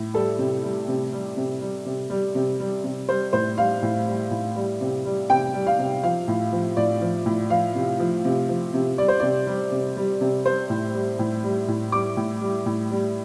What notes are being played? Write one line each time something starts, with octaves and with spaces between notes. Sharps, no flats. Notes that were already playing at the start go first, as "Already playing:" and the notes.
Already playing: A2
G3 A4
C3
G3
C3
G3
C3
G3
C3
G3
C3
G3
C3
G3 C5
A2 C5
G3 F5
A2
G3
A2
G3
C3
G3
C3 G5
G3
F5
C3
F3 F5
A2
F3
A2 D5
F3
A2
F3 F5
C3
F3
C3
F3
C3
G3 D5
C5
C3 D5
G3
C3
G3
C3
G3 C5
A2
G3
A2
G3
A2
G3 D6
A2
G3
A2
G3